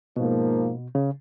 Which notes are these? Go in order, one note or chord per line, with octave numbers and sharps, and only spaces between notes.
G#2 B2 F3 A#3
C#3